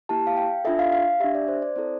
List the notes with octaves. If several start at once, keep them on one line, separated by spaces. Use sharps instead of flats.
A#3 E4 G4 A5
F5
G5
D4 F4 A4 E5
F5
F5
D4 G4 E5
D5
C5
D5
C4 E4 A4 C5